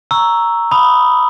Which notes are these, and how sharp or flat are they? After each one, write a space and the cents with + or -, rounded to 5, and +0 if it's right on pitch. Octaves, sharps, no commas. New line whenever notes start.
A#5 +0 C#6 +5 E6 +0
B5 +0 D#6 +0